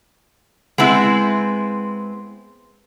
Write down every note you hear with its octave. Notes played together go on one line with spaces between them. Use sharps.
G#3 B3 C4 E4